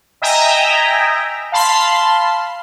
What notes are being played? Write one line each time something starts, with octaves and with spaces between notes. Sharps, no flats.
D#5 E5 G5 G#5 A#5
F5 A5 B5 C6